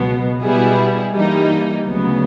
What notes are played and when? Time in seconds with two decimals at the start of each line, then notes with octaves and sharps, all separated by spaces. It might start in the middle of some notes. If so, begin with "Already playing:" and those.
Already playing: C#2 B2 F#3 B3
0.42 B2 G3 B3 E4 G#4
1.14 G2 E3 G3 A#3 D#4
1.87 D2 C#3 F#3 B3